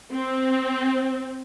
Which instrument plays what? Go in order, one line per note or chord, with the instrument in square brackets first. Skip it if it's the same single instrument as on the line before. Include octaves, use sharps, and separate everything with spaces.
[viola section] C4